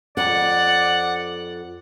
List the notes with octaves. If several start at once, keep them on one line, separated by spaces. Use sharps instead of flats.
F2 D5 F#5